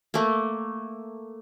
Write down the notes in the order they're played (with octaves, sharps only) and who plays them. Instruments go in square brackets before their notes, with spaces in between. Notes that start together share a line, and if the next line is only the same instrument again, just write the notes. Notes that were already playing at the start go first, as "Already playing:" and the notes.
[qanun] A3 A#3